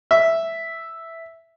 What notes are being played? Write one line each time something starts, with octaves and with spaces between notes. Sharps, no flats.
E5